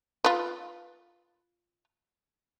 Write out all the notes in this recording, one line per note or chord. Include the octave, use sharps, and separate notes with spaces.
F4 B4